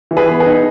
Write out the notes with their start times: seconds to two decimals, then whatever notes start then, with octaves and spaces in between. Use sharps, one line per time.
0.11 E3
0.17 G#4 B4
0.29 B3
0.40 G#4 B4
0.46 D#4